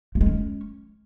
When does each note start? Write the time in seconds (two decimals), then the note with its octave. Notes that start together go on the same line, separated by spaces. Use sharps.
0.15 A3
0.21 G#3
0.26 C#4